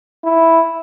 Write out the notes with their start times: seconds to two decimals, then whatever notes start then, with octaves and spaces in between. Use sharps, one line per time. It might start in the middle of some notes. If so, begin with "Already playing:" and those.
0.24 E4